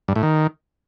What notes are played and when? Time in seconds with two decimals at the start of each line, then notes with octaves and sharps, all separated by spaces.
0.08 G2
0.16 A2
0.23 D#3